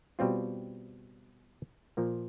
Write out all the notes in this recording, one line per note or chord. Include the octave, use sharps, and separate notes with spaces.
B2 G3 C4 F4
A#2 F3 A#3